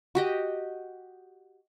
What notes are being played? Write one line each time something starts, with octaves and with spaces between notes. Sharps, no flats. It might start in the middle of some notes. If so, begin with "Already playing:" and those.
F#4 G4 D#5